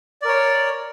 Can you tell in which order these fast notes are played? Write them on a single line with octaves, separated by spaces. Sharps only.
D5 A#4 C#5